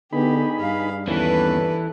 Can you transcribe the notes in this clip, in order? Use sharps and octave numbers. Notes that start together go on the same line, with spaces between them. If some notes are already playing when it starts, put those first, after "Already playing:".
D3 B3 D#4 G4 G#4 B5
G2 F5
D#2 E3 B3 C#4 A4 B4